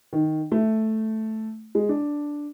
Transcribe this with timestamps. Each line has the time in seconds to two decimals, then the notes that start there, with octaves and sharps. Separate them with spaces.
0.13 D#3
0.52 A3
1.75 G#3
1.89 D4